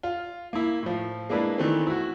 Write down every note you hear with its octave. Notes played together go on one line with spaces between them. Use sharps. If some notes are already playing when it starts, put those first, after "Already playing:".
F4
A#3 E4
A2 F3
G#3 A#3 D4 E4 B4
D#3 E3 A3 B3 C4
E4 F#4